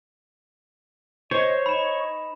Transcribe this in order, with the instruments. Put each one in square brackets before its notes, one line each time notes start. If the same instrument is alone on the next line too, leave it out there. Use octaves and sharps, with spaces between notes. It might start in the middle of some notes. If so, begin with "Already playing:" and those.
[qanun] C5 [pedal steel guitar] C#5 [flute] D#5
[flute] D#4 [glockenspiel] B5 E7